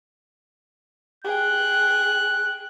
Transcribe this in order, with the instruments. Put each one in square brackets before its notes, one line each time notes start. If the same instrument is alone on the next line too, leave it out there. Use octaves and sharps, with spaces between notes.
[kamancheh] G#4 G5 [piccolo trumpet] F#6